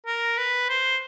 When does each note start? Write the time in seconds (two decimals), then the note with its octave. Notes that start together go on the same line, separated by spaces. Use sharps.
0.06 A#4
0.38 B4
0.69 C5